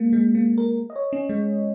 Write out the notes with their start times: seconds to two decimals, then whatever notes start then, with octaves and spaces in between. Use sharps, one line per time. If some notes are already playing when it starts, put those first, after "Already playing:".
Already playing: G#3 A#3
0.13 G#3
0.35 A#3
0.58 A#4
0.90 D#5
0.96 C#5
1.13 C#4
1.29 G#3